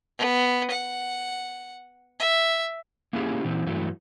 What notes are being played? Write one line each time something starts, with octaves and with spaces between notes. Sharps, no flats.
B3
F#5
E5
A#3 C#4 E4 G4 G#4
A#2 E3 C4 E4
G2 E3 F#3 A3